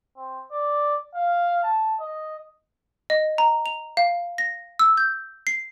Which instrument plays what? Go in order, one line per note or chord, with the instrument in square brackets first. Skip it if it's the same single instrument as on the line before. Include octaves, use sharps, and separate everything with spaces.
[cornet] C4
D5
F5
A5
D#5
[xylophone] D#5
A#5
F7
F5
A#6
E6
G6
C7